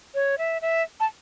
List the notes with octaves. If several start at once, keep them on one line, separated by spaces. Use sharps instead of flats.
C#5
E5
E5
A5